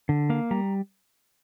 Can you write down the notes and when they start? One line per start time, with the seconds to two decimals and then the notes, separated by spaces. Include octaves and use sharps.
0.09 D3
0.30 A#3 F5
0.51 G3 A#5